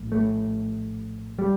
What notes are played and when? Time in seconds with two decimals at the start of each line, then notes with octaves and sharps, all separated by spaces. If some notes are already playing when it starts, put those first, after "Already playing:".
Already playing: A#1 A2
0.12 A3
1.39 G3